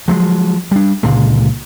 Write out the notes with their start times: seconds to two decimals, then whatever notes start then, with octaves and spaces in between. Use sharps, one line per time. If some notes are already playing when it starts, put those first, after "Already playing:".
0.08 F3 F#3 G#3
0.71 G3 D4
1.03 C#2 A#2 D3 G#3